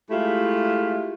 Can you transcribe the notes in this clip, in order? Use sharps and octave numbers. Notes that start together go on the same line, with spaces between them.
G#3 A3 E4 F4 G4